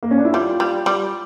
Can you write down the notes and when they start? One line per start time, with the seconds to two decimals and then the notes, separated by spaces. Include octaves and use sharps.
0.03 A#3
0.11 C#4
0.18 D4
0.25 E4
0.33 G3 F4
0.60 G3
0.86 G3